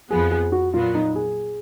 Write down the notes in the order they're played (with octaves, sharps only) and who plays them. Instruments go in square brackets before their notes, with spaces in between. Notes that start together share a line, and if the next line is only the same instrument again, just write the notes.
[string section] F2 F3 B3 [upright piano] G#4
[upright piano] G#4
F#4
[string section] A#2 F#3 B3 [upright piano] F4
[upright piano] D#4
G#4